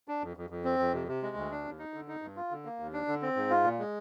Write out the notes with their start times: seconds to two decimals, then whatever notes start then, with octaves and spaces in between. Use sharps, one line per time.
0.08 D4
0.23 F2
0.37 F2
0.50 F2
0.64 C4
0.79 F2
0.94 C3
1.08 C3
1.23 G#3
1.37 D2
1.51 D4
1.65 D#2
1.79 D#4
1.94 D3
2.08 D#4
2.22 G2
2.37 F4
2.51 D3
2.65 A#3
2.80 D#2
2.93 D4
3.08 D3
3.22 C4
3.36 G#2
3.50 F4
3.64 A#2
3.79 G#3